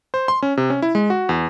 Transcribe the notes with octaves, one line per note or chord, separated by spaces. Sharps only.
C5
C6
C#4
C3
C#4
E4
G#3
F#4
E2